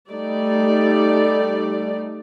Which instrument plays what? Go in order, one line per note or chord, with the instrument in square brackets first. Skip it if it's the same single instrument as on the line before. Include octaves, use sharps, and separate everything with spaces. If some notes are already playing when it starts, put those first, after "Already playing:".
[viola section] G3 A3 D#4 D5